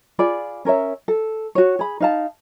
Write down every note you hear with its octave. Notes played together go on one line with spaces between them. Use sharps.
F4 G#4 D5 B5
C#4 A#4 C#5 E5
A4
F#4 C#5
G#4 B5
D#4 F5 A5